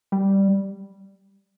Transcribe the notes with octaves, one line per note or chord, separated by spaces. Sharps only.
G3